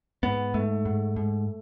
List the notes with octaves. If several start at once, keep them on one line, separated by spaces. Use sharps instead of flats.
G#2 B3
G#2 A3
G#2
G#2